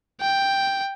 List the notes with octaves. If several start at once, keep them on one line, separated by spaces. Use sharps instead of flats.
G5